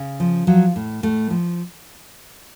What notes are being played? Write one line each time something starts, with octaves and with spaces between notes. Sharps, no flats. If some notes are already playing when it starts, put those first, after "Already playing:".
Already playing: C#3
F3
F3 F#3
A2
A2 A3
F3